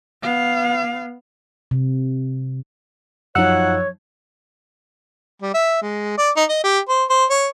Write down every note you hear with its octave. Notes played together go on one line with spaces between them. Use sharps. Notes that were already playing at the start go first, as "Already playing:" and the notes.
B3 F5
C3
F#2 F3 F#3 D#4 C#5 F#5 E6 F#6
G3
E5
G#3
D5
D#4
D#5
G4
C5
C5
C#5